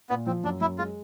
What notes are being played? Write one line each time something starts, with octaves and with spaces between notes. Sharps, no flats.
A#2 B3
F3 C4
F#2 D4
F#2 E4
G#3 F4